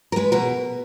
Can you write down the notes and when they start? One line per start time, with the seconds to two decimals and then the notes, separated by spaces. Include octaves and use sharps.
0.12 A#4
0.16 G#3 B4
0.32 B2 A#4